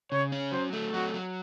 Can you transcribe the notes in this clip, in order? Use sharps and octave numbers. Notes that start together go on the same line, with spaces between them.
C#3 C#5
C#4
F#3 C5
A3
F#3 F#4
F#3